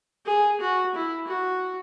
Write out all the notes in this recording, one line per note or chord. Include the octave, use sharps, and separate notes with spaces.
G#4
F#4
E4
F#4